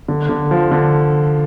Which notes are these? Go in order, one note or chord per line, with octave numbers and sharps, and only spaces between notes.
D3
D3
F3
D3